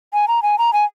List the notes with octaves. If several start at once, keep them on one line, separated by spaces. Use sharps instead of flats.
G#5
A#5
G#5
A#5
G#5